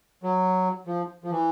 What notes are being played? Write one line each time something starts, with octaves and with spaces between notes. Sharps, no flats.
F#3
F3
F3
E3